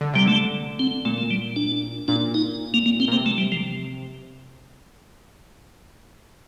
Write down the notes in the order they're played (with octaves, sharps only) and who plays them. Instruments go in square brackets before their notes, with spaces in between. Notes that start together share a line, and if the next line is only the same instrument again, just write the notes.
[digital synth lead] D3
[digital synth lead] C3 [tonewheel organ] G3
[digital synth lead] D3 [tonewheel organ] A3
[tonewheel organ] C4
[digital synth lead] A#2 [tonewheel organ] A3
[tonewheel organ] A3
G3
D4
[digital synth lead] A#2 [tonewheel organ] D4
[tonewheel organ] D#4
A#3
A#3
C4
[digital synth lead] A#2
[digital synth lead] C3 [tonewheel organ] A#3
[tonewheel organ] A3
G3
F3